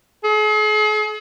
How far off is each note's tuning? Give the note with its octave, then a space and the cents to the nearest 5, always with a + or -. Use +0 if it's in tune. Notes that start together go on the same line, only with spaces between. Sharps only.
G#4 +45